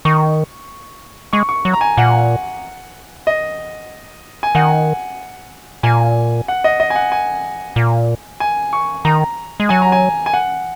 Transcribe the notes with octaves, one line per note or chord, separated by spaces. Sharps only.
D#3 C#6
G#3 C#6
C#6
F#3
A#5
G#5
A#2 F#5
D#5
G#5
D#3 F#5
A#2 G#5
F#5
D#5
D#5
G#5
F#5
G#5
A#2
G#5
C#6
D#3 A#5
G#3
F#3 G#5
A#5
G#5
G#5
F#5